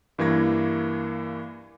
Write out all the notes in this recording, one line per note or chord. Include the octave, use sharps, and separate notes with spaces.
G2 E3 A#3 G#6 A#6